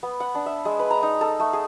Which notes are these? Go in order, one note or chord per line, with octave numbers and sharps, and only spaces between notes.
B3
F#5
D4
E5
G#3
B4
A#5
D#4
A4
A3
G#4